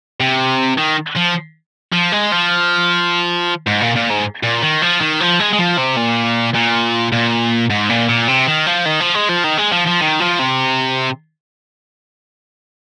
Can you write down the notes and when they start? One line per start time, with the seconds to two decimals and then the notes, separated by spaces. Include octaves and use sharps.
0.20 C3
0.78 D#3
1.16 F3
1.93 F3
2.13 G#3
2.32 F3
3.67 G#2
3.81 A#2
3.95 A#2
4.10 G#2
4.43 A#2
4.62 D#3
4.82 F3
5.01 D#3
5.20 F3
5.40 G#3
5.53 G#3
5.59 F3
5.78 C3
5.97 A#2
6.55 A#2
7.12 A#2
7.70 G#2
7.89 A#2
8.09 A#2
8.28 C3
8.47 D#3
8.66 F3
8.86 D#3
9.00 F3
9.14 G#3
9.29 F3
9.44 D#3
9.57 G#3
9.72 F3
9.86 F3
10.01 D#3
10.20 F3
10.39 C3